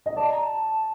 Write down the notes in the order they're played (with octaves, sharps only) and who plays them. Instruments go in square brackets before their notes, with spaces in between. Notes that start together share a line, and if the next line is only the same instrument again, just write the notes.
[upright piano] D#5
[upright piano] D5 [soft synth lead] A5
[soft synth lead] A#5
A5